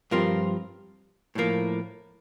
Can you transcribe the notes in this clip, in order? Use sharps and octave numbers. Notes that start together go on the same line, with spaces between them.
G2 F3 C4 F4 A#4
A2 F3 A#3